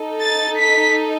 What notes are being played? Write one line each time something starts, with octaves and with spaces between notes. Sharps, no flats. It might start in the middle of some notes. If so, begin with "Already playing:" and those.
Already playing: D#4 A4
A6
B6